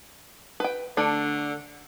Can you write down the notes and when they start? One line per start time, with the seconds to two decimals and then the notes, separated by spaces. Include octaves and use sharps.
0.60 B4 G5
0.97 D3 A3 D4 A4